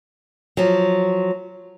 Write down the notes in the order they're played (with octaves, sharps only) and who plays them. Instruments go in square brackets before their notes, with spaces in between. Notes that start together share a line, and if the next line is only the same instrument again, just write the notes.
[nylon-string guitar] F3 F#3